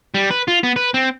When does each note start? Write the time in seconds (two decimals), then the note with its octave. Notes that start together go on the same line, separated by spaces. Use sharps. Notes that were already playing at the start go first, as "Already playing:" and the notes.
0.14 G3
0.30 B4
0.48 F4
0.63 B3
0.76 B4
0.94 C4